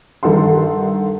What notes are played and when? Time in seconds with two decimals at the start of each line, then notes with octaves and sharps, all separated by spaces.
0.23 G2 D#3 A4 F#5 C6